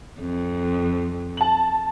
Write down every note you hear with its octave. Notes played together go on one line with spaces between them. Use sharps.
F2
A5 F#7